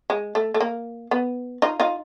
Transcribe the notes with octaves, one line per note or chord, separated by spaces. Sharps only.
G#3
A3
A3
A#3
B3
D#4 F4
D#4 F4